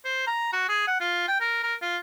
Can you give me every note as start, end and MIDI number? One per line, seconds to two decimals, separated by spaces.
0.05 0.23 72
0.27 0.51 82
0.53 0.64 66
0.69 0.83 68
0.87 1.00 78
1.00 1.24 65
1.28 1.37 79
1.40 1.58 70
1.63 1.74 70
1.82 1.98 65